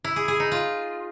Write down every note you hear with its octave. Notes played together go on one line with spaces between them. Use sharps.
E4
G#4
G#4
D#4
F4